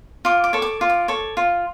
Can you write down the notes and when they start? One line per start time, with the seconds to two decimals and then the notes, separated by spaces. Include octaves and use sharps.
0.25 F4 D6
0.44 D6
0.53 A4 C#5
0.62 D6
0.81 F4
0.89 D6
1.08 A4 C#5
1.37 F4